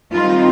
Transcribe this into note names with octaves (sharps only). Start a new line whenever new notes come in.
D#3 G3 C4 D#4 F4